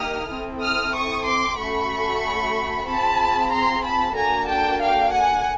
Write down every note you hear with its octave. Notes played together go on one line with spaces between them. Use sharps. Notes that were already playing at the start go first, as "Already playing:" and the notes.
Already playing: A#3 D#4 G4 D#6 F6
C4 E4 A4
D#6 F6
C#6 D#6
C6 D6
A3 C#4 F#4 A4 B5 C#6
C4 F4 G#4 A5 B5
A#5 C6
A5 B5
A#3 D4 F#4 A4 G#5 A#5
G5 A5
F5 G5
F#5 G#5